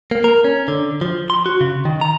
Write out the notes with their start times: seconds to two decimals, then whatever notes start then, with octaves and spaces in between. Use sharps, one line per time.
0.11 A#3
0.24 A#4
0.44 C#4
0.68 D3
1.01 F3
1.30 C6
1.46 F#4
1.61 C#3
1.85 D#3
2.01 A#5